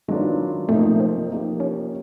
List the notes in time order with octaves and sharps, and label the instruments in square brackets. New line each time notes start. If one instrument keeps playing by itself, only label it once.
[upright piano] D#3 F#3 B3 D4 F4 [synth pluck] G#3
[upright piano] C3 F3 A#3 D#4 [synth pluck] A3
[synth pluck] C4
[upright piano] F3 A#3 D#4 G4
[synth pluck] C#4